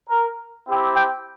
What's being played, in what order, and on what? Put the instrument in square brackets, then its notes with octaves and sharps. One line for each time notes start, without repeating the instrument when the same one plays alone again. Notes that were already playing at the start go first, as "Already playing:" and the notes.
[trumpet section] A#4
C4 E4 G4
G5